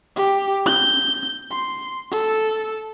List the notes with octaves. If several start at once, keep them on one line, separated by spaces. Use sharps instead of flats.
G4
G6
C6
A4